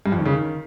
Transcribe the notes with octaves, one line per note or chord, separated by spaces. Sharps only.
G2
F2
D#3
C#3
D#3